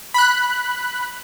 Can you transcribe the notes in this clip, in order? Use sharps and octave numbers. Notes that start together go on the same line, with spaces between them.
B5 F#6